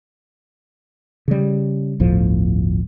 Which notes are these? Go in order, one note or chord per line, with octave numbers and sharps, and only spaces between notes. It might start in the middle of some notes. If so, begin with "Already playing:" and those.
C#3 G3
G1 D2 A2 F3